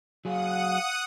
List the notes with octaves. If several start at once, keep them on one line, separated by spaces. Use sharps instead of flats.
F#3 G#4 F5 F#5 D#6